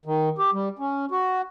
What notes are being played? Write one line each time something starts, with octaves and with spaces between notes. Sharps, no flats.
D#3
G4
G3
C#4
F#4